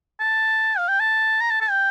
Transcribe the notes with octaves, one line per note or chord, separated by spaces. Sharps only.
A5
F5
G5
A5
A#5
A5
A5
G5